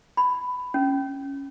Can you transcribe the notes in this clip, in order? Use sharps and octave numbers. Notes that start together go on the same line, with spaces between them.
B5
C#4